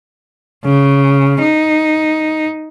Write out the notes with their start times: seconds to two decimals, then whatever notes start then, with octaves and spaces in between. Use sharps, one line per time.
0.65 C#3
1.42 D#4